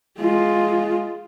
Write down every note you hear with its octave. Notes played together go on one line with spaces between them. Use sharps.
G#3 F4